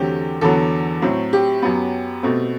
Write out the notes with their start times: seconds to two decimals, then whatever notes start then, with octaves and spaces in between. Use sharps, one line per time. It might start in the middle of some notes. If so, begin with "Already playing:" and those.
Already playing: E2 D3 F#3 A3 C4 G4
0.41 E2 D3 F#3 B3 A4
1.02 A2 F#3 C4
1.33 G4
1.62 F#2 F#3 B3
2.23 B2 A3 C4